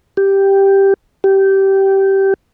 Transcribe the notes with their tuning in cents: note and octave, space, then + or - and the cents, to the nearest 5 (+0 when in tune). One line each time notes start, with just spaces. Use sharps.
G4 +0
G4 -15